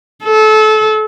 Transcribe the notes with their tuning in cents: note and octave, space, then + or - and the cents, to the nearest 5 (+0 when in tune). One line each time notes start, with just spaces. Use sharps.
A4 -25